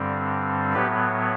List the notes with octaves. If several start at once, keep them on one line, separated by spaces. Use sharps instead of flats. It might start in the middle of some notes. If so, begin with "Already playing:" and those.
Already playing: G2 D3 G3 C4
A2 F#3 B3 G4 B4